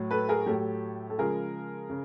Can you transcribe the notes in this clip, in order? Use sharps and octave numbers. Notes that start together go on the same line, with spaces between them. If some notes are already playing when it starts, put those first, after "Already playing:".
Already playing: A2 F#3
A4 B4
G#4 A#4
A2 F#3 G4 A4
A4
C#3 F3 G#3 G#4 A#4
C#3